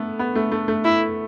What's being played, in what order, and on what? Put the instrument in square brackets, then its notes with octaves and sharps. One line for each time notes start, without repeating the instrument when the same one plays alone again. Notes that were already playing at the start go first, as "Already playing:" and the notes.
Already playing: [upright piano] A3 B3
B3
A3
A3
A3
[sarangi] E4